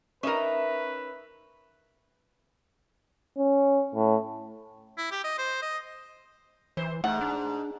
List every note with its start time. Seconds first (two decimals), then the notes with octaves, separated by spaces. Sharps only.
0.23 C#4 D#4 A#4 B4 E5
3.38 C#4
3.95 A2
4.98 E4
5.11 G4
5.24 D#5
5.38 C5
5.62 D#5
6.77 E3 C5
7.04 G#2 A3 F#5
7.21 D4